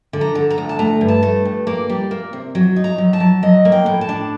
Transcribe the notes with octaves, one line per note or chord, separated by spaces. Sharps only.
D3
A#5
D3
A#5
D2
A5
A3 A#5
G2
A5
A3
G2
A#3 D5
G3
A#3
C3
F#3
D#4
A#5
F#3
A5
F#3
F#3 D#5
A#3
G5
A2
A5
D4